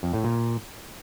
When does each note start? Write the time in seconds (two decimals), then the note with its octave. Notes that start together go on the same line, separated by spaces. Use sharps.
0.03 F2
0.13 A2
0.24 A#2